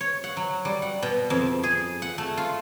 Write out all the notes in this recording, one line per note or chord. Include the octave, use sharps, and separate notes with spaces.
C#5
F#5
F#3
G3
F#5
B2
F2
G#4
F#5
A3
F4